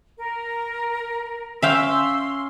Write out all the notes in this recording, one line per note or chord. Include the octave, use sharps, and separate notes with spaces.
A#4
C#4 E5 F5 G5 C6 E6